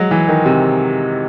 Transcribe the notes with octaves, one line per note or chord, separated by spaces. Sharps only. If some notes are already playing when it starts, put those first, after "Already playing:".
Already playing: F#3 G#3
E3
D#3
C3